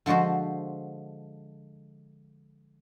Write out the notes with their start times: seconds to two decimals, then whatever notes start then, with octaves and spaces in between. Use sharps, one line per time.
0.06 D3 F3 G#3 F#4 C5